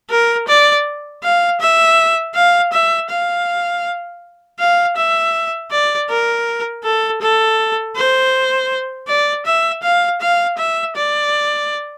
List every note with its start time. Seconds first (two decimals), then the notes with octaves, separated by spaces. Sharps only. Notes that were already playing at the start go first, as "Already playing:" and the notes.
0.10 A#4
0.48 D5
1.23 F5
1.61 E5
2.35 F5
2.73 E5
3.10 F5
4.59 F5
4.97 E5
5.71 D5
6.09 A#4
6.84 A4
7.21 A4
7.96 C5
9.08 D5
9.46 E5
9.83 F5
10.21 F5
10.58 E5
10.96 D5